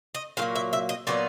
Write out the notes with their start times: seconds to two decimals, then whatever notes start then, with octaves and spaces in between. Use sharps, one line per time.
0.15 D#5
0.37 A#2 F#3 A#3 F5
0.55 E5
0.73 E5
0.89 D#5
1.07 A#2 F#3 B3 D#4 D5